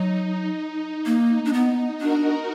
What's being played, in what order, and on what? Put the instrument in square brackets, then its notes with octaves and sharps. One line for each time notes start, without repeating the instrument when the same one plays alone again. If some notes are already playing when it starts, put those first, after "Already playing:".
Already playing: [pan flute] F#3 [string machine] D#4
[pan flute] A#3
D4
B3
[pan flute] D4 [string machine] F#4 A#4